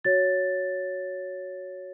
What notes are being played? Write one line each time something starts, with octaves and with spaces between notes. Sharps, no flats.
F#4 C#5 A6